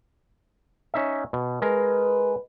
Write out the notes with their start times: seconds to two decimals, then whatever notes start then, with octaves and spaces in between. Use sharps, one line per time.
0.94 C#4 D#4 E5
1.33 B2
1.62 G#3 A#4 B4